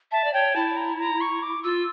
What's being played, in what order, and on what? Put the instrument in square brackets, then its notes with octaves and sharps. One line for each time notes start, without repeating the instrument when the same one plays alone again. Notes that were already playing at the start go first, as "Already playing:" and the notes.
[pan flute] E5 [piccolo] A5
[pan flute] D5
[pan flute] C#5 [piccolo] G5
[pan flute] E4 [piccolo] A5
[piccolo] A#5
A#5
C#6
D6
[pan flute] F4 [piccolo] E6